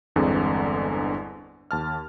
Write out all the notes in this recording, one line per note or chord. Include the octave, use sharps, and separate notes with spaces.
G1 E2 D3 G#3 B3 C4
D#2 A5 F6